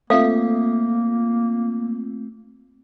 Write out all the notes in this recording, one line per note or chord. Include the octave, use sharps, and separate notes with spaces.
A3 A#3 C4 F4 A4 E5 F5